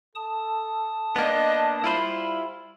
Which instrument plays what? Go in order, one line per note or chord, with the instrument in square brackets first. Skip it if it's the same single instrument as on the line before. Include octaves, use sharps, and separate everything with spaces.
[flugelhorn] A4 [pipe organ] A5 D#6
[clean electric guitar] A#3 B3 [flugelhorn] D4 [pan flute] D#5
[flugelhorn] G3 [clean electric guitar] E4 F4 C5 [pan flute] B5